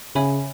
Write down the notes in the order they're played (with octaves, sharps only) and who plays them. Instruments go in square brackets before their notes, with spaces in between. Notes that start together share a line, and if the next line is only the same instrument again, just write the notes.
[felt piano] C#3 [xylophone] C#5 E5 G#5 B5